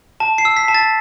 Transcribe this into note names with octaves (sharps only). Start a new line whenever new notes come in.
A5
C7
E6
B6
A5
A6